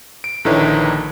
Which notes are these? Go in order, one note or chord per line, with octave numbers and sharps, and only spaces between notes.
D7
A#1 D3 D#3 E4 B4 C#5